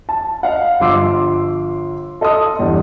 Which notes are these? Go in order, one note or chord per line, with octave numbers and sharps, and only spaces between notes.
A5
D#5 F5 F#5
G1 F3 C6 D6 E6 C7
A4 D#5 A5 C6 D#6
E2 G2